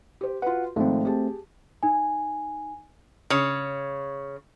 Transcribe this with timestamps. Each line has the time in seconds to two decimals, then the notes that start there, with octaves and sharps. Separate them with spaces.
0.21 G4 C5
0.42 F4 F#4 B4 F#5
0.76 G#1 G#2 F3 A3 C4
1.05 G4 G#4 A5
1.83 D#4 G#5
3.30 C#3 C#5